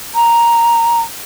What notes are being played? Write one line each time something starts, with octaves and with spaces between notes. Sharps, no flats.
A#5